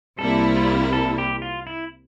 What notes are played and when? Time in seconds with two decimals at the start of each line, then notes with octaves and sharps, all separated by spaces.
0.18 C2 C3 G3 A#3 E4 A4
0.56 F4
0.93 A4
1.18 G4
1.42 F4
1.67 E4